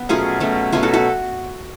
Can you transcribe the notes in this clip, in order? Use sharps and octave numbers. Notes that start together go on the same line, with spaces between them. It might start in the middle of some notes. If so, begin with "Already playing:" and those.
Already playing: B3
B2 F#3 A3 C#4 F4 G#4
B2 F#3 A3 C#4
B2 F#3 A3 C#4 F4 G#4
F#4 A4
F#4 A4